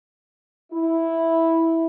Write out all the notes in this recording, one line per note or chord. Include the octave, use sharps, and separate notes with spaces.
E4